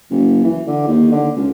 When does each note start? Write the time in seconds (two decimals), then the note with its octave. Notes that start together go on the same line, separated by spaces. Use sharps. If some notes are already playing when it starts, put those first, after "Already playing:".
0.10 F#1
0.43 E3
0.67 D3
0.87 D#2
1.11 D3
1.35 C#2